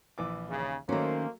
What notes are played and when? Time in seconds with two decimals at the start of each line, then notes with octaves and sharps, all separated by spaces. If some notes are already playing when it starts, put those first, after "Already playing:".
0.18 A#1 E3 D6
0.50 D#2 C#3
0.89 D#3 F#3 A3 A#3 C#4 C5